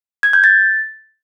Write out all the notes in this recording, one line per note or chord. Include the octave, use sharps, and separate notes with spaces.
G#6
G6
A6